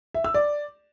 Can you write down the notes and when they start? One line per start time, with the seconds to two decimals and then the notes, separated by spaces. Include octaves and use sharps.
0.14 E5
0.24 E6
0.34 D5